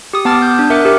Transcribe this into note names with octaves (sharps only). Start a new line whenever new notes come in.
G4 D#6
B3 A5 D6 F6 A6
G6
D4
A#4 E5 F#5 D6 F#6
G4 A#4 E5